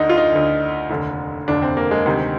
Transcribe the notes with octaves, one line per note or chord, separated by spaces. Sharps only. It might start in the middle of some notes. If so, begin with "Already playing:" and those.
Already playing: D2 D3 D#4
F4
D#4
D2 D3
F1 D#2 D3
F1 D#2 D3 D4
C4
A#3
G#3
D2 C3 D#3